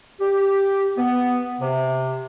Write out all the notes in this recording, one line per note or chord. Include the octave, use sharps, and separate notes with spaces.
G4
B3
C3